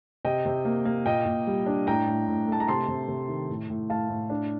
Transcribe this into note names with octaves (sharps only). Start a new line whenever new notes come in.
C3 D#5 G5
C3
A#3
A#3
A#2 D#5 G5
A#2
G3
D4
A2 G5 A#5
A2
A2
A3 A5
A#5
C3 A5 C6
C3
C3
D#3
A2
A2
A2 F5 A5
A2
D4